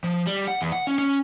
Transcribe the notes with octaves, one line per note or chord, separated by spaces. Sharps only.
F3
G3
F#5
E2
F#5
C#4
C#4